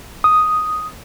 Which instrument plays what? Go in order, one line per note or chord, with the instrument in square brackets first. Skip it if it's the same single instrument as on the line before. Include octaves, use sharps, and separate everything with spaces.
[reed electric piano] D#6